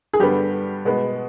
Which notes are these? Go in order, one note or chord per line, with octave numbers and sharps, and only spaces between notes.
G#4
G2 D3 G3 B3 G4
B2 G#3 B3